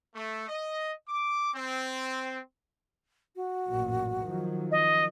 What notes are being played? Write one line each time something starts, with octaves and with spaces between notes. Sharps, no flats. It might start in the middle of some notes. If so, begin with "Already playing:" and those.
A3
D#5
D6
C4
F#4
A1 F#2 A#2
D#3 F3 F#3
D#5